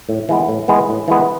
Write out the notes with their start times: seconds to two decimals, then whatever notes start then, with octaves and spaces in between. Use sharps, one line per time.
0.09 A2
0.29 E3 G#3 B3
0.49 A2
0.68 E3 G#3 B3
0.89 A2
1.08 E3 G#3 B3